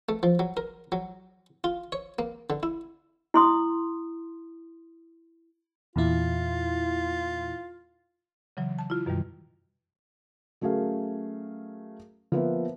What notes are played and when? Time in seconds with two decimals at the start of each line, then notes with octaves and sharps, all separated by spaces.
0.09 A3
0.23 F3
0.39 F#3
0.57 A#4
0.92 F#3
1.64 F4
1.92 C#5
2.19 A#3
2.50 D3
2.63 E4
3.34 E4 C6 D#6
5.96 E2 A#2 E4 F4
8.57 C#3 E3 F#3
8.79 A5
8.90 E4 F4
9.06 F#2 B2 D#3 E3 G3
10.61 F#3 A3 C#4 G#4 A#4 F5
12.32 F3 A#3 B3 B4 E5